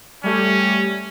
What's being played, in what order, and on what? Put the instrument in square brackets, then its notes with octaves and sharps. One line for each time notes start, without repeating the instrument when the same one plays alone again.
[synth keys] G3 A3 G4 [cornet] C#4